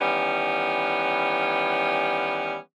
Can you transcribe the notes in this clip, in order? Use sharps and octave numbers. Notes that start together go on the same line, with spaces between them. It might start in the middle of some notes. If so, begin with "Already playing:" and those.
D#3 E3 G3 B3 C#4